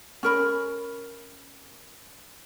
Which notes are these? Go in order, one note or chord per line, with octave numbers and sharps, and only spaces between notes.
C#4 A#4 B5